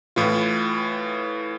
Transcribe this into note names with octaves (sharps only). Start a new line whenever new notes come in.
A2 E3 F4